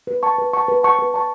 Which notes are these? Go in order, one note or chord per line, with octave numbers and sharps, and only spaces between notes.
B4
A5 C#6
B4
A5 C#6
B4
A5 C#6
B4
A5 C#6